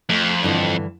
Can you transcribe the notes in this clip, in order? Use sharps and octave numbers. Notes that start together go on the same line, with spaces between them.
F2 A3
G2 D3 E3